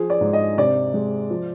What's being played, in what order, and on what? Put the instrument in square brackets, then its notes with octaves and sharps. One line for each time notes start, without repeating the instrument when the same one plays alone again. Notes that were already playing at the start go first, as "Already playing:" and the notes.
Already playing: [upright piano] F3 G#4
D5
G#2
D#5
C3 D5
G#3
F3